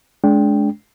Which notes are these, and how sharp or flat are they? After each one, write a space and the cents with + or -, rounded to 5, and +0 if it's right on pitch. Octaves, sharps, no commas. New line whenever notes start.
G#3 +25 D4 -25 G5 +0